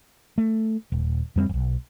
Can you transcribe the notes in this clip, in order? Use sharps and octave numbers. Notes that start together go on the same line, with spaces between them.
A3
D#1
F2 G3 C4
D#1 B1